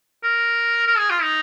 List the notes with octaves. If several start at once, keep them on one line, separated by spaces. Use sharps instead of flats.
A#4
A#4
G#4
F4
D#4